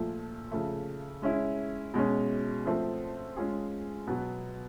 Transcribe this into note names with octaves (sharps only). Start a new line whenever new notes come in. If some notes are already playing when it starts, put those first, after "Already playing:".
Already playing: A#2 F3 A3
C#3 F3 A3
G#3 C#4 E4
B2 G#3 C#4
F3 A3 C4
G#3 C#4 F4 G#4
B2 F#3 B3